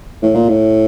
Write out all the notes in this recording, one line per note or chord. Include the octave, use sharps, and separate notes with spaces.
A2
A#2
A2